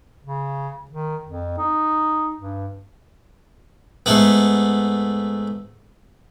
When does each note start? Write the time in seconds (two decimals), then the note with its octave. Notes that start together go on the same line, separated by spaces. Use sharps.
0.24 C#3
0.91 D#3
1.26 F2
1.58 D#4
2.36 G2
4.06 G#2 A3 B3